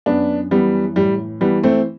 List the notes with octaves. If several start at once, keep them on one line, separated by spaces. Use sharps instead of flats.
F#2 B3 D4
E3 G3 B3
A2 G3
E3 G3 B3
A3 C4